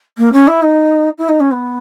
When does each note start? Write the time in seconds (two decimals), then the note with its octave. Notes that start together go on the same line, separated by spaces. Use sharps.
0.18 A#3
0.33 C#4
0.48 E4
0.63 D#4
1.18 E4
1.29 D#4
1.40 C#4
1.52 B3